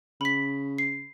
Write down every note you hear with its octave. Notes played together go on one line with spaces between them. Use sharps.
C#3 B5 B6
C7